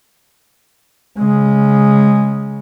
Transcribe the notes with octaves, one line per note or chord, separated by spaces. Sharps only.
C#3 G#3